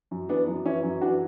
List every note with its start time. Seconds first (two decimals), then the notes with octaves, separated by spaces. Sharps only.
0.11 F#2
0.29 E3 B3 D4
0.48 F#2
0.65 E3 C#4 E4
0.83 F#2
1.01 E3 D4 F#4